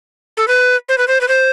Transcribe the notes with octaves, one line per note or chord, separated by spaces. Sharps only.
A4
B4
C5
B4
C5
B4
C5